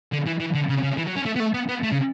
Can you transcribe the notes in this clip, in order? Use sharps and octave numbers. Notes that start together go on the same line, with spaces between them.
D3
E3
E3
D3
C#3
C#3
E3
F#3
C#4
A3
B3
A3
B3
B3
A3
C#3